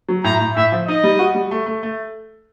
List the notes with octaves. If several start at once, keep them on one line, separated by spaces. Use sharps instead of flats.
F#3
A2 A#5
A2
A2 E5
F3
D#4 D#5
G3
F#4
G3
A3
A3
A3